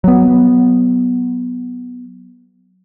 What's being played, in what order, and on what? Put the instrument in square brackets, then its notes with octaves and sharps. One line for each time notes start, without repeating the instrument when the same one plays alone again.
[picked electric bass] F#3 B3